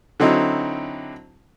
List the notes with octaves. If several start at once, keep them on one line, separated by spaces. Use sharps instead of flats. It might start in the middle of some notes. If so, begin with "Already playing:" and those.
D3 F#3 C4 D#4 E4